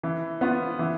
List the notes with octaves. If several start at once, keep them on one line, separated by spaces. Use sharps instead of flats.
E3
B3 F4
E3